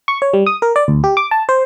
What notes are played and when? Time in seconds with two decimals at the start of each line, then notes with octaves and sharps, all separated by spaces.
0.08 C#6
0.22 C#5
0.33 G3
0.46 D#6
0.62 A#4
0.76 D5
0.88 D2
1.04 G4
1.17 D6
1.31 A5
1.49 C5